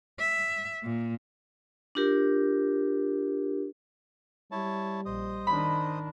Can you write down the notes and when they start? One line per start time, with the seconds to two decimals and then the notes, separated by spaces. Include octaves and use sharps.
0.19 E5
0.83 A#2
1.95 D4 F4 G4 A#4
4.52 G3 E4 C#5 A5
5.06 A#1 C5 D#5 D#6
5.47 D#3 D4 B5